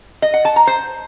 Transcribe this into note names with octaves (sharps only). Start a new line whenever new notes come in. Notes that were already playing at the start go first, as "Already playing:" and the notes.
D#5
F#5
A5
A#5
C5